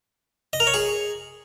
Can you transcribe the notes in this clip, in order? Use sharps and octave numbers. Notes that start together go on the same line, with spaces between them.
D#5
A#4
C#5
G#4